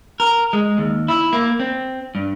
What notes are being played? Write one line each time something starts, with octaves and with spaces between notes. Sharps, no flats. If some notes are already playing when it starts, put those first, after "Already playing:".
A#4
G#3
D#2
E4
A#3
C4
G2